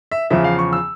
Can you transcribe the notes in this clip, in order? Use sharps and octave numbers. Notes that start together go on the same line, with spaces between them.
E5
E2 C#3 F3 E5
F5
C#6
E6